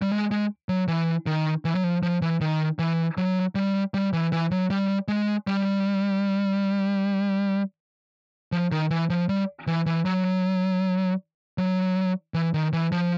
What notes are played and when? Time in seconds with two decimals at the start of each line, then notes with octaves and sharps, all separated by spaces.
0.02 G3
0.12 G#3
0.31 G#3
0.69 F#3
0.88 E3
1.26 D#3
1.65 E3
1.75 F#3
1.84 F3
2.03 F3
2.22 E3
2.41 D#3
2.79 E3
3.18 F#3
3.55 G3
3.94 G3
4.13 E3
4.32 E3
4.51 F#3
4.70 G3
5.08 G#3
5.47 G3
8.52 F3
8.72 D#3
8.90 E3
9.10 F3
9.29 G3
9.67 E3
9.86 E3
10.05 F#3
11.58 F#3
12.34 E3
12.54 D#3
12.73 E3
12.92 F3